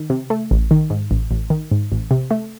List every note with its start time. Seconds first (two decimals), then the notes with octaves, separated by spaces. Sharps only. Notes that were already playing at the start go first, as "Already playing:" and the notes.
Already playing: D#3
0.10 C3
0.30 A3
0.51 A1
0.71 D#3
0.90 G#2
1.11 A1
1.31 A1
1.50 D#3
1.72 G#2
1.92 A1
2.11 C3
2.31 A3